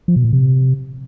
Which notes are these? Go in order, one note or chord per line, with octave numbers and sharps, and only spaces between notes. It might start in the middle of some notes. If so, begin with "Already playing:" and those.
F3
B2
A#2
C3